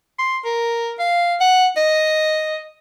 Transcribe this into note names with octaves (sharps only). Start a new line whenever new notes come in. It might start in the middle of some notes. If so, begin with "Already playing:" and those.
C6
A#4
F5
F#5
D#5